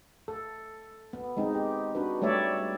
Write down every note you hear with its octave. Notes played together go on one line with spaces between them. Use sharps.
A4
B3
G#3 C4 D#4
G4
D4 F#4 B4
G3 A3 C#5 D5 E5